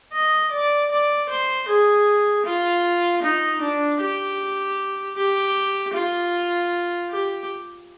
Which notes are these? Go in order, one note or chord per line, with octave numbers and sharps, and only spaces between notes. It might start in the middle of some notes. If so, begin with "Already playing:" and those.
D#5
D5
D5
C5
G#4
F4
D#4
D4
G4
G4
F4
G4